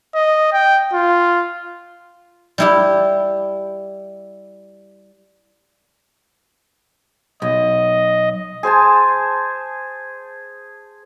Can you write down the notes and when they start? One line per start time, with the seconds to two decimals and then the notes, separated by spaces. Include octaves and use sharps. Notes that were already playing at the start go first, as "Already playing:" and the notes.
0.15 D#5
0.52 G5
0.94 F4
2.58 G3 E4 G4
7.42 B1 D#5
8.63 G#4 C5 G#5 A5